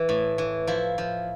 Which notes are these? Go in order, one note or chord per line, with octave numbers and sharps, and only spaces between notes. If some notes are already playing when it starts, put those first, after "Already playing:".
Already playing: E3
A2
E3
F3 E4
F3